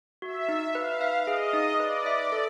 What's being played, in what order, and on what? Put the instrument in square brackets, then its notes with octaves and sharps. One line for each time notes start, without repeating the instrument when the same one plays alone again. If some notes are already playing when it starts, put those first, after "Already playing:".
[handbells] F#4 [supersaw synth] E5
[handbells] D#4
[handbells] B4 [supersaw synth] F5
[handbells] E5
[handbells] G#4 [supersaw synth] D#5
[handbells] D#4
[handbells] B4 [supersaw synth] D5
[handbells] E5
A4